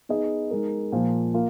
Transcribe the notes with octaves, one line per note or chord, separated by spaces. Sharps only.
B3 D#4 G#4 D#5
G#3 D#4 A#4
A#2 F3 A#3
A#3 F4